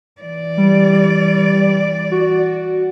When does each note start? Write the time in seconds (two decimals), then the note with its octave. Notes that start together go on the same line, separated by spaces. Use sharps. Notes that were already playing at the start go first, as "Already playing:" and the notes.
0.21 E3 D5
0.57 G3
2.11 F#4